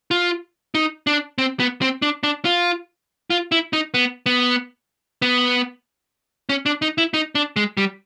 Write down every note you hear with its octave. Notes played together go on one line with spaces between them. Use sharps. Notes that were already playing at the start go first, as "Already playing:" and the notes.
F4
D#4
D4
C4
B3
C4
D4
D4
F4
F4
E4
D#4
B3
B3
B3
C#4
D4
D#4
E4
D#4
D4
G#3
G3